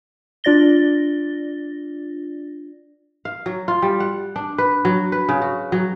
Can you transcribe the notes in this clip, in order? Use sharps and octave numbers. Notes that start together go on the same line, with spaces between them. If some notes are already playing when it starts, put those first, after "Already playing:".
D4 F4 D5 A6 A#6 G7
F5
F#3
F4
G3
F#5
D4
B4
F#3
B4
C#3
F#4
F#3